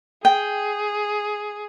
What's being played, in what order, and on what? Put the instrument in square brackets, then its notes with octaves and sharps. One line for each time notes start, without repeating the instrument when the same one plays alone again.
[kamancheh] G#4 [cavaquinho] G5